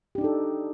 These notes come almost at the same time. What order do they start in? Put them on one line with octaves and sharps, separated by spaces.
G4 D4 D#4 A4